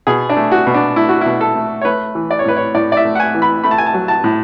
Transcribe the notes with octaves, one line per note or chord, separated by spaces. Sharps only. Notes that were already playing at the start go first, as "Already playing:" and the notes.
B2 G#4
D4
A3
F#4
B2
D4
A3 E4
F#4
B2 E4
A4
A3
C#5
A3 B4
E3
D5
C#5
A2 B4
C#5
A2 D5
D5
E5
A3
F#5
G#5
E3
B5
A3 B5
A5
G#5
A5
F#3
A5
A2